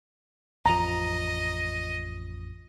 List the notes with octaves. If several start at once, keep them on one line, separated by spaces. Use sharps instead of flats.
A1 F2 F3 D#5 A#5